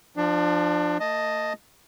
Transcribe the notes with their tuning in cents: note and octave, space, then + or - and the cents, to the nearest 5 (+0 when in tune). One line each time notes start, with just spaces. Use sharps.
F3 +0 D4 +25
A3 +45 D#5 +0 A5 +0